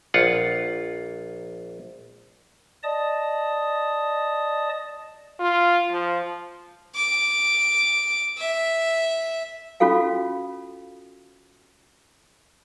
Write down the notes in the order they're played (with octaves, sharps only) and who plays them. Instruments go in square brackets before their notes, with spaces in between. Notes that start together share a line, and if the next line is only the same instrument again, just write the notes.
[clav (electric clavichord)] A#1 F4 F#5
[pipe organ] D5 D#5 A5 D#6
[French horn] F4
F3
[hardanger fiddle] D6
E5
[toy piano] C#4 F4 F#4 A4 F5